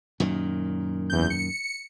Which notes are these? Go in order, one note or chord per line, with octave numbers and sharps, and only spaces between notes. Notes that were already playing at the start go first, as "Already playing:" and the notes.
F#2 A#2 D#3
E2 G6
C#7